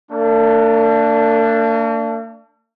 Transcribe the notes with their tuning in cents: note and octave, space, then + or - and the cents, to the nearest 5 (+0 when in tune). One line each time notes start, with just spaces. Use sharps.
A#3 -45 D4 +0